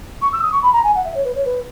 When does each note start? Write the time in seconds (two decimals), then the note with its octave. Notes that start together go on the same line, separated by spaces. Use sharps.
0.21 C#6
0.32 E6
0.41 D#6
0.52 C#6
0.62 B5
0.72 A#5
0.83 G#5
0.94 F#5
1.04 E5
1.14 C#5
1.24 B4
1.35 C#5
1.45 B4